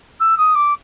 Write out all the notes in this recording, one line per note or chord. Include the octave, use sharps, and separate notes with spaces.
E6
D#6
D6